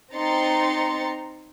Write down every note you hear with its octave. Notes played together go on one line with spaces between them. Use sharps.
C4 D#4 A#5 C6 A6 C#7